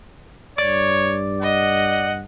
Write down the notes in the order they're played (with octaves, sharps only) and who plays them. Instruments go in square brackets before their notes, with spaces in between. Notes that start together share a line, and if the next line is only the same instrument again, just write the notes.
[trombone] G2 [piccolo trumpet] C#5 [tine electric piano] D5 D6
[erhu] D#5 [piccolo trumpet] F#5